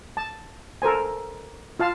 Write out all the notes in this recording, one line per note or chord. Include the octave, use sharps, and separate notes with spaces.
A5
A4 A#4 C5 G#5
F4 F5 A5